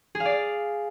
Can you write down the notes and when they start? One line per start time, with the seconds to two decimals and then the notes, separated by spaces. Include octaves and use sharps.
0.15 G#4
0.20 F5
0.25 D5